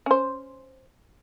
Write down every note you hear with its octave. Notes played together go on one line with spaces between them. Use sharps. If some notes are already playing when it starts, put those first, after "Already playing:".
C#4 C5